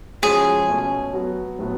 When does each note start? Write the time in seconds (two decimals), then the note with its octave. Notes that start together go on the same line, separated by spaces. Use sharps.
0.22 F3 G#3 C#4 F#4 G#4
0.69 B2 A3 C#4
1.13 F#3 B3 F#4
1.59 A2 F#3 B3